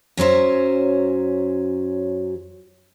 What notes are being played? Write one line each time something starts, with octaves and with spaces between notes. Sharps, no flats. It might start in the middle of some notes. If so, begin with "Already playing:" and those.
F#2 F#3 C#4 C5 E5